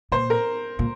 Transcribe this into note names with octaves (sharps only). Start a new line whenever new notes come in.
A#2 C5
A#4
A#2